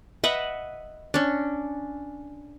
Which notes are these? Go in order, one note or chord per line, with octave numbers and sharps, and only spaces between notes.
B4 D#5 E5 F#5
C#4 D4